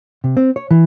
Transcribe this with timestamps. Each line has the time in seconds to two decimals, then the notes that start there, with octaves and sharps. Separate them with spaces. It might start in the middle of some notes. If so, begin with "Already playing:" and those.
0.24 C3
0.37 C4
0.56 C#5
0.71 E3